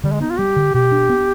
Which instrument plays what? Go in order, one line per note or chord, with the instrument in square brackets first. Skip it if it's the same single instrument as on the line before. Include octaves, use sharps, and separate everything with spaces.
[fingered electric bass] D3 [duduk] G3
[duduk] G#3
[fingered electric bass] B3 [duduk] D#4
[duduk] F4
[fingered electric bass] G3 [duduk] G4
[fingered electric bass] D3
[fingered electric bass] B2 [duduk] G4
[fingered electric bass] D4
B3